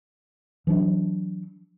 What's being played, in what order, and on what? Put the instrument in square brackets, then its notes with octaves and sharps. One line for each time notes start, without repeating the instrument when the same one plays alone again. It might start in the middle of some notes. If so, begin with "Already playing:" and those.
[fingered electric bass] E3 F#3 D4